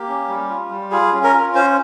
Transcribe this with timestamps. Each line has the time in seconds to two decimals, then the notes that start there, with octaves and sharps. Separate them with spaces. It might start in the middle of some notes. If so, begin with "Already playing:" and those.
Already playing: A#3 G4
0.08 C#4
0.29 G3
0.50 F4
0.71 G3
0.91 F4 G#4
1.12 C#4
1.24 A#4
1.34 F4
1.55 C#4 C5